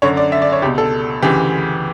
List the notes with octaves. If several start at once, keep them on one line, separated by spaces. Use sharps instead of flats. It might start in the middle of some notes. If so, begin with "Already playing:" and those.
F#2 D3 C#5
D5
E5
D5
C#5
C#2 B2 G4
A4
D2 C#3 E3 G4